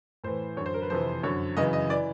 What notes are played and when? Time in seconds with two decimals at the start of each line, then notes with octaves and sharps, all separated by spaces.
0.24 A2 E3 C5
0.57 F#2 D3 C#5
0.66 C5
0.74 A#4
0.82 B4
0.90 F2 C3 E3 C5
1.23 F#2 D3 C#5
1.57 F#2 C#3 E3 D#5
1.73 D#5
1.89 E3 D5